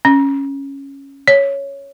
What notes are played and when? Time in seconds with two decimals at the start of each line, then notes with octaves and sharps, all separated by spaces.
0.05 C#4
1.28 C#5